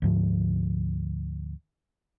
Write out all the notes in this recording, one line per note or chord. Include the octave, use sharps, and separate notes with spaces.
D2 G#2 F3